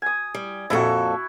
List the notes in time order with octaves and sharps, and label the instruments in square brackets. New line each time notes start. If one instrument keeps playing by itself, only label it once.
[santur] G#5 D#6
[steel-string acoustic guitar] G3
[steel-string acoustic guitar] F2 A#2 A4 [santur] E4 F#4